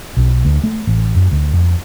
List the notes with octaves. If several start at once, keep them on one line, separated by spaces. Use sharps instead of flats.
B1
D2
A3
A1
F#2
D2
F2